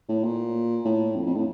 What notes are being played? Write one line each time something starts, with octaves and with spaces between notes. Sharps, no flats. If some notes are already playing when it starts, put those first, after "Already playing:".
A2
A#2
A2
F2
F2
A2